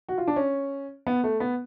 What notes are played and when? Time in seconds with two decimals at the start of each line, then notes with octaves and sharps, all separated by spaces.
0.09 F#4
0.18 F4
0.27 D4
0.36 C#4
1.07 B3
1.24 A3
1.40 B3